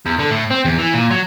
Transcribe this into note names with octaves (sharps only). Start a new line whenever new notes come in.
E2
D3
A2
C4
E2
E3
A#2
F#3